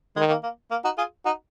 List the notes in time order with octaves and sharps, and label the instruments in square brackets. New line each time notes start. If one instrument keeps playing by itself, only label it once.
[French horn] D#3 [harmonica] G#3
[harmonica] A#3
A#3
A#3
D#4 F#4
F4 G#4
D#4 F#4